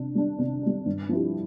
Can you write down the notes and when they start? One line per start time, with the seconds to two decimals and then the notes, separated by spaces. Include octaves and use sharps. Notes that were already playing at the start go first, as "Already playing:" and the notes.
Already playing: C3 D4
0.15 G3 D4
0.39 C3
0.62 G3 D4
0.86 G2
1.09 F3 C4 E4 G4